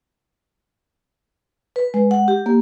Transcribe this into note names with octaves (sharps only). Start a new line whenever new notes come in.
B4
G#3
F#5
G4
A#3